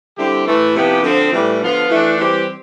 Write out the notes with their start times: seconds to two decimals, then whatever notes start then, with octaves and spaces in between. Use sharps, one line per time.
0.18 D3 G3 C4 E4 G4
0.46 A2 E3 A3
0.75 C3 F3 B3 E4 G4
1.03 D3 F3 C4
1.32 A2 E3 G3
1.61 D3 F3 B3 F4
1.89 E3 A3 D4
2.18 E3 G3 C4 G4